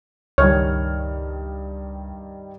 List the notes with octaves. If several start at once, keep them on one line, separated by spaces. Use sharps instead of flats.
C#2 G2 D#3 C#5 F6